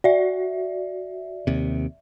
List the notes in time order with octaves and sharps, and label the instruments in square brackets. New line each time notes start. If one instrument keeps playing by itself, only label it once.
[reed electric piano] F#4 [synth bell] D5 E5
[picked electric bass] D#2 C3